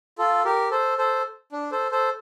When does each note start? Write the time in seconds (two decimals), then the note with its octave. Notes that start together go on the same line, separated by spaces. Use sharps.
0.18 F4 A4
0.45 G4 A#4
0.71 A4 C5
0.98 A4 C5
1.52 D4
1.72 A4 C5
1.91 A4 C5